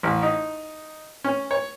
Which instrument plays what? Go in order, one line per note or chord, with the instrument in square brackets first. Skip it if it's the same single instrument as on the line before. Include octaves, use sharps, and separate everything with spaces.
[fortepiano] A1
D#4
C#4
C#5